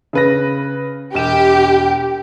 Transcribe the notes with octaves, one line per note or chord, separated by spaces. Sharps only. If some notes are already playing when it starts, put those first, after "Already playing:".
C#3 B4 A#6
E1 G4 E7